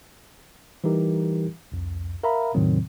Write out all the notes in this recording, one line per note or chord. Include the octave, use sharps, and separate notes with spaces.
E3 G3 D#4 G4 A#4
C2 F2
A#4 E5 F5 A#5 B5
E2 A2 C3 D#3 F#3 C4